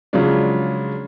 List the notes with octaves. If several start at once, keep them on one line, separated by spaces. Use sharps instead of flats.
C#3 F3 F#3 G#3 C#4 D4